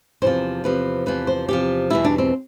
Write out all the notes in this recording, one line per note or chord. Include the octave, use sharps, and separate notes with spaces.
E2 C3 F3 C5
E2 C3 F3 B4
E2 C3 F3 B4
C5
E2 C3 F3 G4
E2 B2 G3 E4
D4
C4